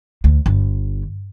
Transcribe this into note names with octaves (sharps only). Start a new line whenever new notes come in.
D2
G1